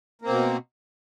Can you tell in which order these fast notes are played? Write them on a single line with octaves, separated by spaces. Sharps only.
A#3 C4 B2